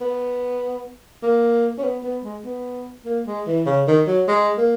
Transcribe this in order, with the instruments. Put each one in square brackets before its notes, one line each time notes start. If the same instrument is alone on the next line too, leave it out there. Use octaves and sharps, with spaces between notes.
[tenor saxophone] B3
A#3
C#4
B3
B3
G#3
B3
A#3
G#3
E3
C#3
D#3
F#3
G#3
A#3